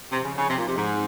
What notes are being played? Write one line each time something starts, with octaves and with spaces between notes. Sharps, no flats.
C3 F3 C4 D#4 G#4 D#5
C#3
C#3
C3
A#2
C3
G#2